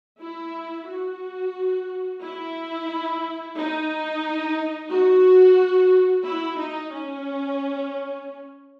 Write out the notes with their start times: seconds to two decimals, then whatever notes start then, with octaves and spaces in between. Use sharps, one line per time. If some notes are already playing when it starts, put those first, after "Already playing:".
0.20 E4
0.87 F#4
2.22 E4
3.57 D#4
4.90 F#4
6.25 E4
6.59 D#4
6.92 C#4